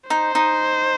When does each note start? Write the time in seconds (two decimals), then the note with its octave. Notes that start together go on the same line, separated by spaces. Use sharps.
0.10 D#4 C5
0.35 D#4